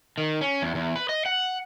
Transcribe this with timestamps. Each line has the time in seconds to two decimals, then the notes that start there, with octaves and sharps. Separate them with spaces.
0.18 D#3
0.41 C#4
0.62 E2
0.75 E2
0.96 B4
1.09 D#5
1.26 F#5